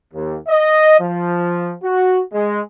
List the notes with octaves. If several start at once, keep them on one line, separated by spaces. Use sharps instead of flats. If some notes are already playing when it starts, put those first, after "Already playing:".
D#2
D#5
F3
F#4
G#3